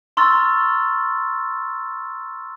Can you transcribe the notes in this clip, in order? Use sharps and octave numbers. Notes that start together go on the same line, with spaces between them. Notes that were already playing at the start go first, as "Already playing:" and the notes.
A#5 C6 C#6 E6 F6 A6